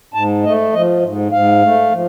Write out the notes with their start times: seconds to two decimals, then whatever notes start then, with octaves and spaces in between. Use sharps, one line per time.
0.14 G#2 A5
0.43 A3 D#5
0.73 F3 D#5
1.02 G#2
1.32 G#2 F5
1.62 A3
1.91 F3